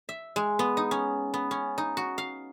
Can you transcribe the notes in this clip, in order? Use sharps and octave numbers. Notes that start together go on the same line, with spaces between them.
E5
G#3
B3
D#4
C#4
B3
C#4
D#4
F#4
F5